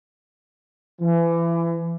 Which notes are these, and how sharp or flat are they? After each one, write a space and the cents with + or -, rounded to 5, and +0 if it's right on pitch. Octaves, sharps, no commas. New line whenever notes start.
E3 +30